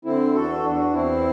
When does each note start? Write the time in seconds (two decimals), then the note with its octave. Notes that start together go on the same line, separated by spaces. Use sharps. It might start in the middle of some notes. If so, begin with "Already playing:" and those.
0.05 D3 C4 E4
0.34 E2 F#4 A4
0.63 E2 D4 F#4
0.93 E2 C4 E4